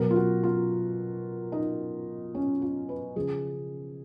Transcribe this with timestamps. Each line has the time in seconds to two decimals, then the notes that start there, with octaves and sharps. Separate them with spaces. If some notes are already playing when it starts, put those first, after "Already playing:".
Already playing: B2 F#3 A#4
0.11 F4
0.16 F#4
0.43 F4
1.52 D#4
2.35 C#4
2.62 F4
2.89 B4
3.16 C#3 F3 G#4